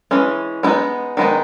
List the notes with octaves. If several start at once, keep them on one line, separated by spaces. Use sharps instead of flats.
E3 G#3 C#4
G#3 B3 D#4 E4
D#3 G#3 B3 D#4